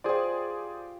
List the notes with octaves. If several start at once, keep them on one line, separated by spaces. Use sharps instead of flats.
F4 G4 G#4 C5 D5